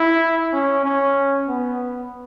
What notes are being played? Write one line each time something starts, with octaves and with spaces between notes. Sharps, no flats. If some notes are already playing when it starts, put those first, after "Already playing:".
Already playing: E4
C#4
C#4
B3